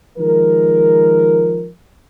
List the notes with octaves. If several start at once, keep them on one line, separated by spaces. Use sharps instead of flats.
D#3 F3 G#3 A#4